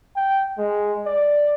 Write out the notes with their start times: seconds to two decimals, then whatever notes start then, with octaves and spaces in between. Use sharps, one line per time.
0.16 G5
0.58 G#3
1.06 D5